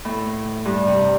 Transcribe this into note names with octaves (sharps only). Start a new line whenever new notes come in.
A2
G2
C3